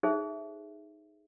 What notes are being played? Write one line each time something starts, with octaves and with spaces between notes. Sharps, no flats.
D#4 G#4 A4 C5 E5